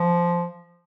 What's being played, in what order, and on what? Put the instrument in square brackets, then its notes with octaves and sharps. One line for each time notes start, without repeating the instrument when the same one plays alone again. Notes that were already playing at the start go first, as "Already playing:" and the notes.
Already playing: [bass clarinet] F3